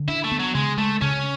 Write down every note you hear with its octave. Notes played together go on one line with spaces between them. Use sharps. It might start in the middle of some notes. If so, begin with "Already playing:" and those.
Already playing: D3
D4 E4
A3
B3
F#3
C#3 G#3
G#3 A3
C#3 C#4